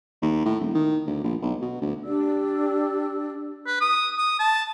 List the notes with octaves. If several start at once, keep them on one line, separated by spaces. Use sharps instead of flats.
D#2
A2
E1
D#3
D2
A#1
B1
B2
D2
D4 G4 D5 E6
B4
D#6
D#6
A5